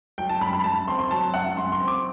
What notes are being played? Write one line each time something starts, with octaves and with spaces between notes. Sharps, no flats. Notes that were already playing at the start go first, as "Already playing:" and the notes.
F#3 G5
A5
F#2 B5
B5
F#2 A5
C4 C6
C6
F#3 A5
F#2 F#5
F#2 C6
C6
C4
D6